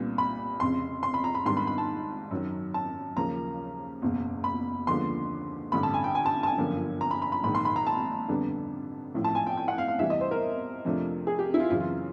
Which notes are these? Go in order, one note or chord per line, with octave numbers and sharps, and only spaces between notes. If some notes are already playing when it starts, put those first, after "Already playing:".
Already playing: C2 A#2 G3 B3 D4
B5
F1 F2 C#3 C6
C6
B5
A#5
B5
G#2 D#3 G3 B3 D4 C6
B5
B5
A5
F#2 D#3 F#3
A5
D#2 C#3 F3 A#3 A#5
F#1 E2 B2
B5
D#2 D3 F3 G#3 B3 C6
A1 G2 D3 B5
A5
G#5
G5
G#5
A5
A5
G#5
G1 F#2 D3 F3 A#3
A#5
B5
B5
B5
A#1 G#2 D#3 B5
C6
B5
A#5
A5
F2 D3 G3 B3 D4
A1 A2 F3
A5
G#5
G5
G5
F#5
F5
F5
E2 C3 E3 G3 E5
D#5
C5
A#4
F2 C3 F3 A3 D4
G#4
G4
E4
F4
F#2 C#3 E3 F4
F4